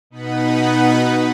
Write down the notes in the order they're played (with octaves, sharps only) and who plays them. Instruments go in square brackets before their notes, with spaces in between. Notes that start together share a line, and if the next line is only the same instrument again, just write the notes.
[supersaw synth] B2 B3 D#4 B4 F#5 B5